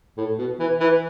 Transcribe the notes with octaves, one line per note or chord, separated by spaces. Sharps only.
A2
B2
E3
E3